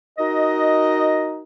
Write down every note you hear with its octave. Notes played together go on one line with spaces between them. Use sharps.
D#4 F#4 A#4 D#5